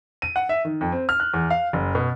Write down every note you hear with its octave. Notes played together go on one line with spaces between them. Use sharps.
D#7
F#5
E5
D#3
F2
C4
F6
F#6
E2
F5
F#1
B2